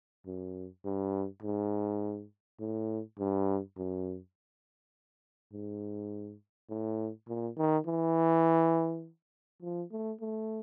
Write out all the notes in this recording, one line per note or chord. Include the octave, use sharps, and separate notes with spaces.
F#2
G2
G#2
A2
G2
F#2
G#2
A2
A#2
D#3
E3
F3
A3
A3